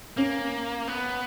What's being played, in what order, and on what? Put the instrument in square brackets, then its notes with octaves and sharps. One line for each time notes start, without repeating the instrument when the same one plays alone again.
[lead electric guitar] A#3 [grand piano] C#4
[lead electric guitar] B3